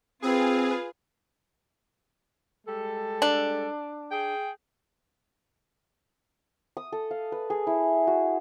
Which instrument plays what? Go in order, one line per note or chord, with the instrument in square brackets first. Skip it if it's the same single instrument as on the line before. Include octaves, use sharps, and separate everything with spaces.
[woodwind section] C4 [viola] F4 B4 [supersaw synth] G#4
[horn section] G3 G#3 A4
[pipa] D4
[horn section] G#4 G5
[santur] D#6
A4
F5
B4
G#4
E4
F#4